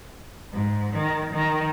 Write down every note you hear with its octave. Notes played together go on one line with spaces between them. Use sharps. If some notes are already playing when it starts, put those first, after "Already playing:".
G#2
D#3
D#3